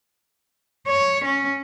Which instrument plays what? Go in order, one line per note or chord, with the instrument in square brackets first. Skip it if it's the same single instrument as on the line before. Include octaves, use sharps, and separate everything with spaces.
[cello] C#5
C#4